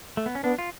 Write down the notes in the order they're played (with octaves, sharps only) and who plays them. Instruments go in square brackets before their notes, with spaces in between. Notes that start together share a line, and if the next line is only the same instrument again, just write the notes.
[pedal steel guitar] A3
B3
C#4
[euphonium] B3 [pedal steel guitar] D4
[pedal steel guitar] F4